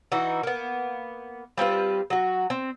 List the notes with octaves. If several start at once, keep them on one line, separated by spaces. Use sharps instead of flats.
E3 D#4 F#4
A#3 B3
G3 C4 F4 B4
F#3 F#4
C4